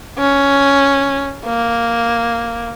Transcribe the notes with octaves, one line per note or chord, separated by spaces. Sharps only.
C#4
A#3